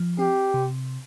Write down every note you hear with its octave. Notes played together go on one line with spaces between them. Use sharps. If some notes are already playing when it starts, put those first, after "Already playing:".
Already playing: F3
C4 G4
C3